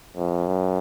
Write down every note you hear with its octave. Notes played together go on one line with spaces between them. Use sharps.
F2
F#2